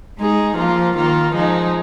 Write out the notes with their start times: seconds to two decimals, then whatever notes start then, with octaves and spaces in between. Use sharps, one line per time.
0.18 G#3 D#4 G#4
0.56 F3 A#3 F4
0.95 D#3 A#3 F4
1.33 F3 G#3 D#4